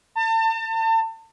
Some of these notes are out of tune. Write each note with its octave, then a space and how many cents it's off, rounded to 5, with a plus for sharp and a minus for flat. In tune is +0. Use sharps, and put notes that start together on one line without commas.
A5 +35